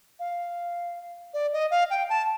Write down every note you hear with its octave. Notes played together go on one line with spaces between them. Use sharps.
F5
D5
D#5
F5
G5
A5